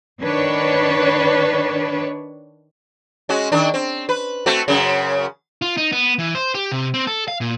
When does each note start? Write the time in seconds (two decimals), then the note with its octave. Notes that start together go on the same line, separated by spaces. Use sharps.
0.22 D#3 D4 B4 C#5
3.29 G#3 C#4 F#4
3.52 D#3 D4
3.74 C4
4.09 B4
4.46 A3 C4 F#4
4.68 F#2 C#3
5.62 F4
5.77 D#4
5.92 B3
6.19 E3
6.35 C5
6.55 G4
6.72 C3
6.94 C4
7.07 A4
7.28 F5
7.41 A#2